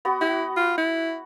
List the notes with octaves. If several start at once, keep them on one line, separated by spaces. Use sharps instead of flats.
B3 F#4
E4 F#4
F4
E4